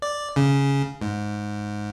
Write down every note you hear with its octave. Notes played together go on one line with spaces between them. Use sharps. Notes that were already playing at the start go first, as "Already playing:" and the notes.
D5
C#3
G#2